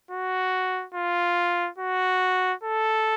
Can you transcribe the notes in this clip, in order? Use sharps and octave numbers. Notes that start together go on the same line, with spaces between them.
F#4
F4
F#4
A4